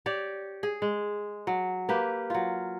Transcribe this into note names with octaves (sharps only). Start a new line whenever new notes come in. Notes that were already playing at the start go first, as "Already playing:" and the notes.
G4 C#5 D5
G#4
G#3
F#3
A#3 G4 B4
F#3 F4